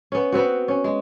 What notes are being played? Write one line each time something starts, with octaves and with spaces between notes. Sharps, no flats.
B3 C#4
B3 C4 F#4
C#4
G#3